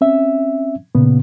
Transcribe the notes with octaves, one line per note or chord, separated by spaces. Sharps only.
C4 C#4 E5
A#2 C#3 B3